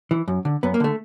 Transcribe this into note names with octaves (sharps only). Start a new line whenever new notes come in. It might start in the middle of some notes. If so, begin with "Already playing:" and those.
E3
F#2
D3
F#2 B3
A#3
D3 A3